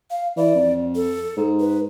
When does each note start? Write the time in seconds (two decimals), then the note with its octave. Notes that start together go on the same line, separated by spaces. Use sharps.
0.11 F5
0.37 E3 D5
0.55 F2
0.96 A4
1.37 G#2
1.60 B4